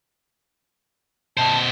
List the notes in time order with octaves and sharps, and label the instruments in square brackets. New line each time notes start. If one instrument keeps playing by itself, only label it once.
[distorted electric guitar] B2 C5 [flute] A5